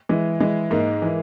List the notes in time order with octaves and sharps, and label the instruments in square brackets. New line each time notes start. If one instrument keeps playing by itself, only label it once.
[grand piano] E3 [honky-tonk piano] G#3
[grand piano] E3 [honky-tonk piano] G#3
[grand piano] G#2 [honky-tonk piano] A#3
[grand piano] E3